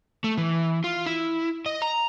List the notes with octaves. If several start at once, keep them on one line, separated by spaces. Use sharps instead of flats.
A3
E3
F4
E4
D#5
A#5